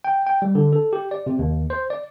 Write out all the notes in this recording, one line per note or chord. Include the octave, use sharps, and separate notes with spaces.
G5
G5
G3
D3
A4
G4
D5
C3
D#2
C5
D5